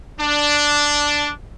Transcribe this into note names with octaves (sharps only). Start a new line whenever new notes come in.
D4